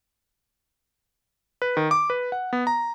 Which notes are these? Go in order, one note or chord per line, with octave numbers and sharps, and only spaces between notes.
B4
D#3
D6
B4
F#5
B3
A#5